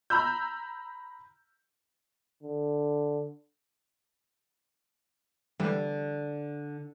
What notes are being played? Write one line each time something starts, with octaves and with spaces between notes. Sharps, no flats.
A#5 B5 E6 G6
D3
D3 E3 G3